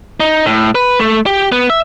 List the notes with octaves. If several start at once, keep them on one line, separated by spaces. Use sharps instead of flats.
D#4
A2
B4
A3
G4
B3
E5